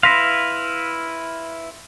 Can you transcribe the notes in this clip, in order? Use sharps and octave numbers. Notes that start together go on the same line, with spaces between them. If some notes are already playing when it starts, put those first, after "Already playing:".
E4 B4 F5 C6 A#6 B6